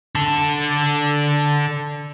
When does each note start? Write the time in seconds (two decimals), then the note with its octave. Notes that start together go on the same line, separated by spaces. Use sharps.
0.15 D3 A4